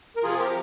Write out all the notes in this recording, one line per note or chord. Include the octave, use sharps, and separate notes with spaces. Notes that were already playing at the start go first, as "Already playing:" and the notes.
A#4
C3 F3 F4 G#4
G4 A#4